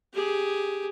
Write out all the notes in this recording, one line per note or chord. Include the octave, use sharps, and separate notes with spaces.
G4 G#4